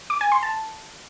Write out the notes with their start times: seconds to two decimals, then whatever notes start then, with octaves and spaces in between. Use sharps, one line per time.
0.10 D6
0.21 G#5
0.32 C6
0.43 A5